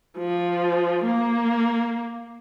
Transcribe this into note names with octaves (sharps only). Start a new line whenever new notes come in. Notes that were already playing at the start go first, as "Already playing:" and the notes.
F3
A#3